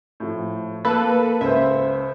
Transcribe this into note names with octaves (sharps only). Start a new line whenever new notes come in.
A2 F3
A#3 A4 B4
C#2 C5 E5